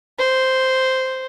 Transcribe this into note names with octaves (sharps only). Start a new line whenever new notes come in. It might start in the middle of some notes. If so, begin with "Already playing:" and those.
C5